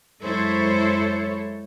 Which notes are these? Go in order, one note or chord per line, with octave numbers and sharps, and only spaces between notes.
F#2 G#3 E4 A4 C5 C#5